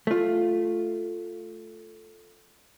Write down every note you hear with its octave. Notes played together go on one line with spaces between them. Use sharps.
A3 F4